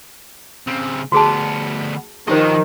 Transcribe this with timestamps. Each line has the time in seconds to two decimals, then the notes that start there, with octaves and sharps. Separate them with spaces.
0.67 C#3 C4
1.12 D2 B3 F#4 G#4 A5
2.28 D#3 F3 G4 C5 D#5